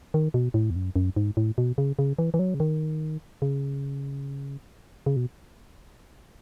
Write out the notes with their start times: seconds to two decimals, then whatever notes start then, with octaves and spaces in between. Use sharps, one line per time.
0.14 D#3
0.34 B2
0.54 A2
0.70 E2
0.76 F#2
0.96 F#2
1.16 G#2
1.37 A2
1.58 B2
1.78 C#3
1.99 C#3
2.19 E3
2.34 E3
2.39 F#3
2.54 C#3
2.60 D#3
3.42 C#3
5.06 C#3
5.16 B2